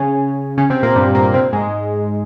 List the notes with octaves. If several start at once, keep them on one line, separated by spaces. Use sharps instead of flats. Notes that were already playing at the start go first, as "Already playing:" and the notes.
Already playing: C#3 C#4
C#3 C#4
C3 C4
A#2 A#3
G2 G3
A#2 A#3
C3 C4
G#2 G#3